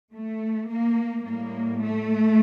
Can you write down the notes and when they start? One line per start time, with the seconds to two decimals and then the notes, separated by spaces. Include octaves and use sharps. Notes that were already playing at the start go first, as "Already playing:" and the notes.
0.14 A3
0.69 A#3
1.24 A2 G3 A#3
1.80 A3